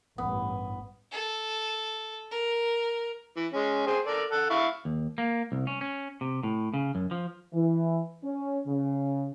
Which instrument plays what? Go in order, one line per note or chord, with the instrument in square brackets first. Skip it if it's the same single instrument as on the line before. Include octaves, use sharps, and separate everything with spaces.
[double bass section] A1 G2 [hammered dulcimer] B3
[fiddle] A4
A#4
[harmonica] E3
G#3 C#4
G#4 C5 G5
A4 A#4 D5
A4 F#5
E4 F5 C#6
[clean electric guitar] D#2
A#3
C2
C#4
C#4
C3
A2
C#3
F#2
F3
[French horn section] E3
C#4
C#3